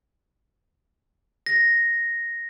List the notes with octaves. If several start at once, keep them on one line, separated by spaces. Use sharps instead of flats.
A#6